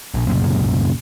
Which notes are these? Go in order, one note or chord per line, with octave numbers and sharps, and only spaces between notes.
A#1
C2 F#2 A#2 C#3